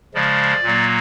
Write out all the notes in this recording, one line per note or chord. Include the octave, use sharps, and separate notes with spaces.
C#3 F3 G#3 D5
A#2 F#3 A#3